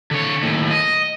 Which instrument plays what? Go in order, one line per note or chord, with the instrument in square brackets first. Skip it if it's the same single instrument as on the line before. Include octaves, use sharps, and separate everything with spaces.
[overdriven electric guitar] D3 C#5
D#2 A2
D#5